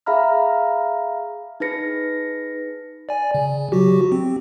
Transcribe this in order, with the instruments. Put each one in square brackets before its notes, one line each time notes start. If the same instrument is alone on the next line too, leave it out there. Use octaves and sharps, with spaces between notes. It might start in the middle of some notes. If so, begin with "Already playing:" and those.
[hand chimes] G#4 E5 F5 A#5 B5 F6
D#4 G#4 B4 A#6 C#7
[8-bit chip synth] D5 G#5
C#3
F#3 F#4 G4
C4